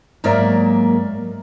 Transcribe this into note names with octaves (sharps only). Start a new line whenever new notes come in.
G#2 F#3 A#3 A#4 D5 E5